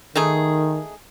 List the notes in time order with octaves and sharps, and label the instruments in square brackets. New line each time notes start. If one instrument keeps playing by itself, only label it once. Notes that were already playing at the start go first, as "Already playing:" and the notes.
[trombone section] D#3 [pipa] A3 D#4 G#4